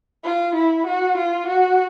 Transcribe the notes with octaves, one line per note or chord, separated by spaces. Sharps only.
F4
E4
F#4
F4
F#4